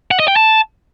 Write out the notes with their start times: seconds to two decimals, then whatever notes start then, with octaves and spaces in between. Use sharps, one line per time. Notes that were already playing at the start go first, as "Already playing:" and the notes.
0.11 F#5
0.20 D#5
0.28 G5
0.36 A5